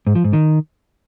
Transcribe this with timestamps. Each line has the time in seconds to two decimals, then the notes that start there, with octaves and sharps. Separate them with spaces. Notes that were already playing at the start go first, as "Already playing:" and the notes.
0.07 G#2
0.15 F3
0.24 G#2
0.33 D#3